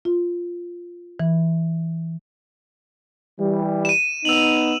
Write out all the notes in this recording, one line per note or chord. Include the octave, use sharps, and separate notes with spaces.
F4
E3
E3 G3
D#7 E7
B3 D#4 E6 F7 F#7